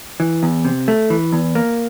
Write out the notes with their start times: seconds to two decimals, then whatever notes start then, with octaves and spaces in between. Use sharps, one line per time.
0.20 E3
0.43 E2
0.65 C3
0.88 A3
1.10 E3
1.33 E2
1.55 A#3